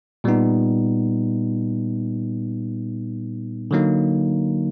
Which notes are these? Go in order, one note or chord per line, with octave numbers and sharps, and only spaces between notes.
A#2 G3 B3 D#4
D3 F#3 A#3 D#4